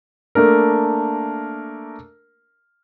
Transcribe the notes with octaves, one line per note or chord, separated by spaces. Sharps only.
A3 A#3 D4 A#4